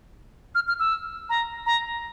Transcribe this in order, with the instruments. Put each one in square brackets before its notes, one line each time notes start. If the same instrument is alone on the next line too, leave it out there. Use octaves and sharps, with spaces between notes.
[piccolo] F6
F6
E6
A#5
A#5